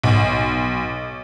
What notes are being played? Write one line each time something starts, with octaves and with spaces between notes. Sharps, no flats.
B1